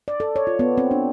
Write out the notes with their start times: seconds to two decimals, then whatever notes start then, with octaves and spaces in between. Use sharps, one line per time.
0.08 D5
0.20 A4
0.36 C#5
0.47 F4
0.59 B3
0.78 C4
0.91 D4